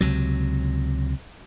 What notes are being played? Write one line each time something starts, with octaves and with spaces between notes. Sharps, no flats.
C#2 C3 F#3